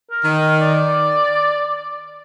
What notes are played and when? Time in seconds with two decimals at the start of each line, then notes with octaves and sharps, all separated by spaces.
0.11 A#4
0.23 D#3
0.37 A#4
0.61 D5